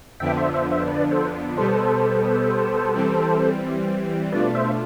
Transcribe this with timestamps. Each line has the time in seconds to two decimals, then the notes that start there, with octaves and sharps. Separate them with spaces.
0.20 F2 D3 F3 B3 D4 E5 G5
0.37 C5 E5
0.54 C5 E5
0.71 C5 E5
0.88 B4 D5
1.11 A4 C5
1.57 B2 G3 B3 A4 C5
2.94 E3 G3 C4
4.32 B2 A3 D4 F4 B4 D5
4.55 C5 E5